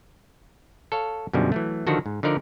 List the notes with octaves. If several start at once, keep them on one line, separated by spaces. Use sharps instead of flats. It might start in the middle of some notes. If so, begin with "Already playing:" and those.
A4 C#5 F5
F#2 B2 D3 D#3 F3 G3
E3 F#3 A3
D3 D#3 F3 F#4 A4
G#2
D3 F3 D#4 A#4 D5